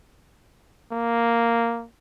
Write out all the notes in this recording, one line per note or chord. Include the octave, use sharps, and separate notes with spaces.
A#3